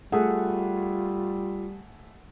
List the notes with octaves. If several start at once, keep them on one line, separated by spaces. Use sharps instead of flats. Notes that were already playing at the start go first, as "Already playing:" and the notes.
G3 A3 F4 G#4 F#5